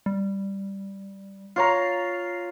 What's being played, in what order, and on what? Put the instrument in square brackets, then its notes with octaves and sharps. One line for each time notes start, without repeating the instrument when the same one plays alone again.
[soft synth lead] G3
[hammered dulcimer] F4 C#5 A#5 [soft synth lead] C7